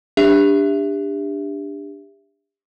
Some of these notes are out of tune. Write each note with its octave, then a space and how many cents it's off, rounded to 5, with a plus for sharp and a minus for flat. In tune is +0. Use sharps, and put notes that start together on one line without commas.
D4 +0 G4 +30 E5 +10